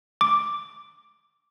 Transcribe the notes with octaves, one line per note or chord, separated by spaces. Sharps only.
D6